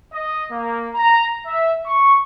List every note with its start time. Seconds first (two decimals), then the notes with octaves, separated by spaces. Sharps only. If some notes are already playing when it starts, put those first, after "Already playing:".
0.13 D#5
0.51 A#3
0.94 A#5
1.46 E5
1.86 C#6